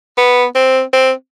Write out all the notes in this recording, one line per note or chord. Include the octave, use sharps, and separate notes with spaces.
B3
C4
C4